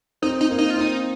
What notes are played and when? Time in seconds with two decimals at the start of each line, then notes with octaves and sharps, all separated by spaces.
0.22 C4 D#4
0.41 D#4
0.50 A#3
0.58 D#4
0.70 F4
0.77 C4 D#4